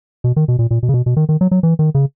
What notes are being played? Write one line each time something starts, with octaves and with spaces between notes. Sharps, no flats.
B2
D#3
B2
A#2
A#2
B2
C#3
B2
B2
D#3
D#3
F#3
F#3
E3
D#3
C#3